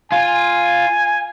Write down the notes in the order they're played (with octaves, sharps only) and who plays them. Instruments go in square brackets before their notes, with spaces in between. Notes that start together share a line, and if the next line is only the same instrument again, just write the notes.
[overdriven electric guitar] F4 [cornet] G#5